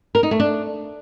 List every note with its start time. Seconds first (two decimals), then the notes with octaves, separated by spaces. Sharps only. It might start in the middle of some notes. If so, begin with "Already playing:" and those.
0.15 A#4
0.23 D#4
0.31 A3
0.40 D4